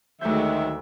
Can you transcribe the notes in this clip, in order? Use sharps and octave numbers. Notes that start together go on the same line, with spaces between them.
D2 D#3 F#3 G#3 A3 E5 G6